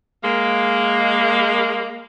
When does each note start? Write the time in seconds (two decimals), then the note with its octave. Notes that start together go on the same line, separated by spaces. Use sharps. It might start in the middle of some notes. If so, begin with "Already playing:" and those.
0.23 G#3 A#3